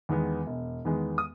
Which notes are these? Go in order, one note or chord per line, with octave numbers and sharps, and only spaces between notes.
E2 D#3 G#3 B3
E1
E2 D#3 G#3 B3
D#6